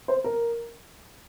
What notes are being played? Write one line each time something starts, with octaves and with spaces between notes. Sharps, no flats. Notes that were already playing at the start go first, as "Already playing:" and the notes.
C5
A#4